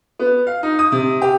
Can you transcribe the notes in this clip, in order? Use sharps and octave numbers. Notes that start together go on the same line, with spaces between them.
B3
F5
D#4
D#6
C3
G4